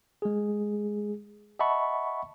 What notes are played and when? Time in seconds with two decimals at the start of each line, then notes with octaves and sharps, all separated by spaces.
0.22 G#3 G#4
1.59 D#5 E5 F#5 A5 B5 C#6